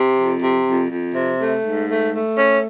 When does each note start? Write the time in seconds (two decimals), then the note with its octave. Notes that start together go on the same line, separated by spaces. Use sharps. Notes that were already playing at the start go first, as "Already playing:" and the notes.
Already playing: C3
0.17 F2
0.41 C3
0.66 F2
0.90 F2
1.15 C3
1.40 A3
1.64 G#2
1.88 A3
2.13 A3
2.38 C#4